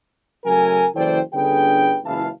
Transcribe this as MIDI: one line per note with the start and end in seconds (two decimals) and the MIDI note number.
0.45 0.88 49
0.45 0.88 54
0.45 0.88 57
0.45 0.88 70
0.45 0.88 80
0.95 1.19 30
0.95 1.19 52
0.95 1.19 69
0.95 1.19 72
0.95 1.19 74
0.95 1.19 79
1.33 1.98 31
1.33 1.98 50
1.33 1.98 61
1.33 1.98 68
1.33 1.98 71
1.33 1.98 79
2.05 2.28 30
2.05 2.28 37
2.05 2.28 52
2.05 2.28 64
2.05 2.28 77
2.05 2.28 81